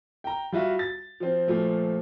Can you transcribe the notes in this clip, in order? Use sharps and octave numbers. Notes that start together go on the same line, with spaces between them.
G5 A#5
G3 F4 F#4 E5 F5
A6
F3 C4
A#2 F3 A3